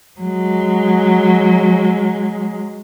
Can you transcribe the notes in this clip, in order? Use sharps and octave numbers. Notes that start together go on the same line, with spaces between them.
F#3 G#3